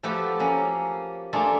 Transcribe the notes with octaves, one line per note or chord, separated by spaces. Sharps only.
F3 A3 F#4 G4 A4 B4
A#3 C#4
A3 A#3 D4 F4 G#4 A4